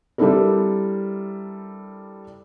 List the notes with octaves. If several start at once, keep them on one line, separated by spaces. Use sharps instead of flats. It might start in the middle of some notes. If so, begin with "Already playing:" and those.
G3 C4 D4 E4 A4 A#4